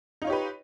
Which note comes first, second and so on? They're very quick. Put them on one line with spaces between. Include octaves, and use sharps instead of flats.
D#4 F4 C#5 G4 B4